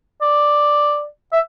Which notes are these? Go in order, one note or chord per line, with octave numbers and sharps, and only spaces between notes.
D5
E5